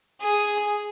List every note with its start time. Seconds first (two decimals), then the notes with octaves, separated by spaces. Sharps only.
0.20 G#4